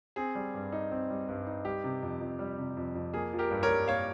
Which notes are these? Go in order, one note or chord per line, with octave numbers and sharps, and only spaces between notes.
C4 G#4
G3
G2
D#4
C4
G3
G2
D#4
G3 G4
C3
F2
F2
G3
C3
F2
F2
A#3 G#4
F3
G4 A#4
G2
A#4 C#5
G2
A#3 C#5 F5